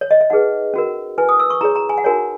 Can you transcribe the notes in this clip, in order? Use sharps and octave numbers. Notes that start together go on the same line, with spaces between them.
C#5
D#5
E5
D#4 G#4 B4 F#5
C#4 F#4 A#4
E4 B4 G#5
D#6
E6
C#6
E4 G#4 C#5 A#5
A#5
G#5
F#5
D#4 F#4 A#4 C#5 G#5